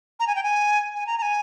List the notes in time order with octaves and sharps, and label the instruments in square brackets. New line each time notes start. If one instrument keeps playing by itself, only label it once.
[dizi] A#5
G#5
G5
G#5
G#5
A#5
A#5
G#5